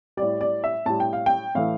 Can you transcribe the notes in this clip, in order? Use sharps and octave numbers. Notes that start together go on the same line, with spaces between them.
A2 G3 D5
D5
E5
A2 G3 A5
G5
F5
G5
A2 E3 A3 F5